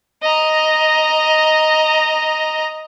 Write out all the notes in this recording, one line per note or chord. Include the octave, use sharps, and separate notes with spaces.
D#5 A#5